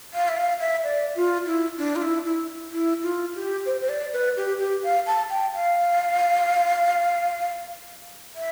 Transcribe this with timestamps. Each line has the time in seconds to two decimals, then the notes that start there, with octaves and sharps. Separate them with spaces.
0.14 F5
0.28 E5
0.37 F5
0.60 E5
0.84 D5
1.16 F4
1.46 E4
1.78 D4
1.96 F4
2.02 E4
2.25 E4
2.71 E4
3.03 F4
3.35 G4
3.66 C5
3.81 C5
3.89 D5
4.13 B4
4.37 G4
4.60 G4
4.83 F5
5.06 A5
5.30 G5
5.54 F5
8.35 E5